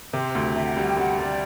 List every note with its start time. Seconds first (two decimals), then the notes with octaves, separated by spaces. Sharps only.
0.13 C3 C5
0.35 D2
0.42 E5
0.56 C3 E5
0.66 F#5
0.77 G3 F#5
0.87 G5
0.97 G3 F#5
1.19 G3 D5